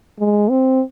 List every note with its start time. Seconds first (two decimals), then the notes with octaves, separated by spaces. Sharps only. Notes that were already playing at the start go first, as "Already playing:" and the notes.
0.19 G#3
0.50 C4